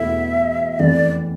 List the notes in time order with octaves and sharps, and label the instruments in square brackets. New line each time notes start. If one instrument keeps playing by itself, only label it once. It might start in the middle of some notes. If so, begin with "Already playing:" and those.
Already playing: [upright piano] E2 B2 A3 E4 [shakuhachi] E5
[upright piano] F2 E3 A3 [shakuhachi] D5